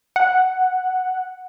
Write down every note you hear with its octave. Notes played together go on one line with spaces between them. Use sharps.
F#5